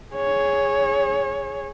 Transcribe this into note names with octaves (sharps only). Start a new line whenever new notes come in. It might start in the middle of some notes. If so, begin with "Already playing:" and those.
G#4 C#5